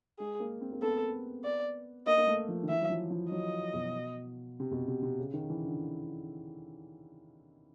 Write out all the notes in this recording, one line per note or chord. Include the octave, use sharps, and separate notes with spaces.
G#3 G#4
A#3
C4
A#3
B3 A4
D5
A#3 D#5
A#3
A3
F3
D#3
E3 E5
F#3
F3
F3
F#3 D#5
B2
C3
B2
C3
C3
C#3
D#3
E3
D3